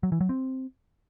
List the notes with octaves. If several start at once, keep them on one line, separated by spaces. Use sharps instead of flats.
F#3
E3
F#3
C4